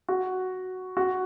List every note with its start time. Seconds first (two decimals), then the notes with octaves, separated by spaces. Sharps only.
0.09 F#4
0.97 F#4